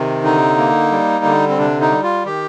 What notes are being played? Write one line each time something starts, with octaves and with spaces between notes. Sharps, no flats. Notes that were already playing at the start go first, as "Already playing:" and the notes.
Already playing: C3 D#3
D3 D#4
A#3
G3
D3
C4
C3 D4
D#4
G3
F4
D#3 G4